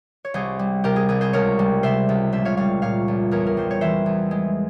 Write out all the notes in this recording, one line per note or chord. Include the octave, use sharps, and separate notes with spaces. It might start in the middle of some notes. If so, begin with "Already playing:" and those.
C#5
C2 G#4 C5
G3
C3 G4 A#4
G#4
C2 G#4
G#4 C5
C#2 A#4 C#5
G3
C3 C5 E5
C#2
A#1 C5 E5
C#5 F5
G3 C#5 F5
A#2 C#5 F5
A#1
E2 A#4 C#5
A#4
G3 C5
C#5
E3 C5 E5
E2
G#3